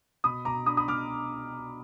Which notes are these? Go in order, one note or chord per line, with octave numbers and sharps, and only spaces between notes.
B2 B5 D#6
B2 A#5 D6
D4 B5 D#6
B5 D#6
B2 D6 F6